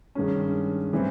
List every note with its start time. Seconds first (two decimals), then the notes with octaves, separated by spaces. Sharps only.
0.15 G2 D#3 G#3 C#4
0.93 E3 G3 C4